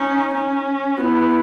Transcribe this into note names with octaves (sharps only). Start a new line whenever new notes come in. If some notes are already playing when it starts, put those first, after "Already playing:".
Already playing: C#4 D#4
C#4
B3 E4 F#4